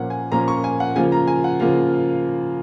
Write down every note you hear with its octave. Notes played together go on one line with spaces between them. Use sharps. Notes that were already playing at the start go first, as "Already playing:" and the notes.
Already playing: A#2 F3 A#3 C#4 F#5
G#5
A#2 F3 A#3 C#4 A#5
C#6
G#5
F#5
C#3 F3 A#3 F4 G#5
A#5
G#5
F#5
C#3 F3 A#3 F4